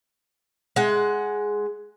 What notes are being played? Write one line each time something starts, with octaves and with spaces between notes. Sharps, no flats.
G#3 F#5